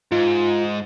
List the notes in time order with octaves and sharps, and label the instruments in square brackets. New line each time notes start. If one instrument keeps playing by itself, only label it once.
[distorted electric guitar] G#2 [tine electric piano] F4